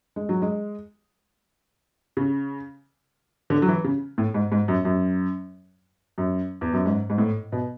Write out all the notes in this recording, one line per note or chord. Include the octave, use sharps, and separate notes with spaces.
G#3
F#3
G#3
C#3
D3
F#3
E3
C#3
A2
G#2
G#2
F#2
F#2
F#2
E2
F#2
G#2
G#2
A2
B2